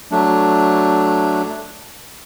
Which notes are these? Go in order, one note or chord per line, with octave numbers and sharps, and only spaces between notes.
F#3 A3 D4